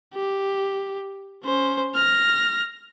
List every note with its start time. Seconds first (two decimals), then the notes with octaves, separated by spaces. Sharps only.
0.14 G4
1.44 C#4 C5
1.95 F6 A#6